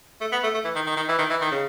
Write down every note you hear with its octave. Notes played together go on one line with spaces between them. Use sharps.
A3
B3
A3
A3
E3
D#3
D#3
D#3
E3
D#3
E3
D#3
C#3